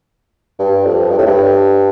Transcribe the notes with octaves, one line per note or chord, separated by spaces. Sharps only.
G2
F2
G2
A2
G2